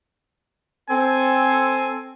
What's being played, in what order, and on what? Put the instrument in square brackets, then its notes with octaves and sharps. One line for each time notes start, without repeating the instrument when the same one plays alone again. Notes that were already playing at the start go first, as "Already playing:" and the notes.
[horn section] C4 A4 [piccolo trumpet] G#5